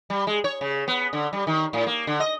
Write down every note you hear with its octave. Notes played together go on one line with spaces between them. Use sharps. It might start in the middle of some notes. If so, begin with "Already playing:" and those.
G3
G#3
C#5
C#3
B3
D3
G3
D#3
A2
A#3
D3
D#5